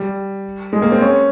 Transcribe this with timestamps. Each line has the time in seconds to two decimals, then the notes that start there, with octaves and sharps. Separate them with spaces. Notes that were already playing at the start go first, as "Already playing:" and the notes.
Already playing: G3
0.73 G#3
0.82 A#3
0.92 C4
1.01 C#4